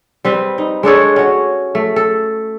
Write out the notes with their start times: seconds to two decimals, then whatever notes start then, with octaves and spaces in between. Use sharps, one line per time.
0.25 G3 C4 B4
0.58 D#4
0.83 G#3 D4 A4 C#5
1.16 C#4 F#4
1.75 A3
1.96 A4